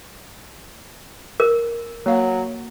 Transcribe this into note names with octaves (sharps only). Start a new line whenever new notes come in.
A#4
F#3 A#3 F5